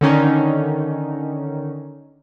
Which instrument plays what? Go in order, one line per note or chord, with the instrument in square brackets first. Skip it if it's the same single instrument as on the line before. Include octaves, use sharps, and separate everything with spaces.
[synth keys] D3 D#3 C#4 D#4